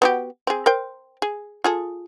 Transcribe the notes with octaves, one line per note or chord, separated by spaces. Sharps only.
B3 F#4 G4
C4 G#4
A#4 C5 G5
G#4
F4 G#4 A4